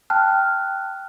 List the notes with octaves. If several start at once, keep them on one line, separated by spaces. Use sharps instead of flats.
G5 A5 F6 F#6